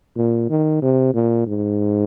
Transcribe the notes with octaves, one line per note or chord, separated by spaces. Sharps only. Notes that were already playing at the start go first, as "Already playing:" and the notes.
A#2
D#3
C3
A#2
G#2